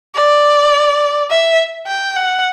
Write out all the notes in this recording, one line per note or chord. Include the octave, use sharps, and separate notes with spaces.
D5
E5
G5
F#5